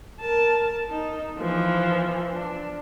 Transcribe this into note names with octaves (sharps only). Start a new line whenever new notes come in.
A#4 A5
D#4
E3 F3
D4